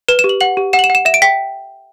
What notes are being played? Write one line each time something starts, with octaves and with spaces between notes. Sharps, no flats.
B4 E7
E7
G4
F#7
F#5 F#7
G4
F#5 E7
F#7
E7
F#5
E7
E5 E7
D7
G5 B6